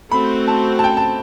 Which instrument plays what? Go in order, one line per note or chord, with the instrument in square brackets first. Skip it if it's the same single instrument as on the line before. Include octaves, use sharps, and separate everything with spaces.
[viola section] A3 C4 F#4 C5 [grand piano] B5
[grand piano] A5
A5
G5
A5